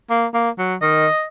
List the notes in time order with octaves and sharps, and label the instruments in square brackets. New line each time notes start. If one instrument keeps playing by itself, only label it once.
[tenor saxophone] A#3
A#3
F#3
[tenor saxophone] D#3 [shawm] D#5